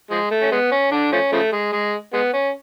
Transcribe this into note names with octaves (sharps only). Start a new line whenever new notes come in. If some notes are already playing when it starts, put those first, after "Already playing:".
F3 G#3
A3
C#4
G#3 B3
C#4
D3 D4
F3 A3 C#4
C#3 F3 A3
G#3
G#3
G#3 B3
C#4